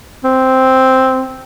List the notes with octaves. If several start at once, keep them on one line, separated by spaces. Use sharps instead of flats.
C4